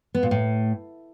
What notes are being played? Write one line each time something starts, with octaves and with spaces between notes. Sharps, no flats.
B3
A#2
A2